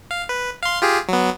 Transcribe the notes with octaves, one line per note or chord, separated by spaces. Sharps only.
F5
B4
F5 C6
F4 G4 G#4
F#3 B3